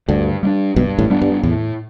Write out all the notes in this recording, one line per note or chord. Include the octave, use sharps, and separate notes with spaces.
D2 G2 D3
G3 B3 D4
B1 G2 B2
A1 A2
G3 B3 D4
G2
E2 A2